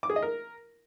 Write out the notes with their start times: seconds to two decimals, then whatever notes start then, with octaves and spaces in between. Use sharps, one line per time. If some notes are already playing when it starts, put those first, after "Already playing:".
0.03 D6
0.10 G#4
0.16 D#5
0.22 A#4